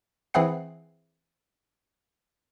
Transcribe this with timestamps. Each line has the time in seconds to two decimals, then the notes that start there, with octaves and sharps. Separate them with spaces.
0.34 E3 C4 E4 G#4 F#5 C7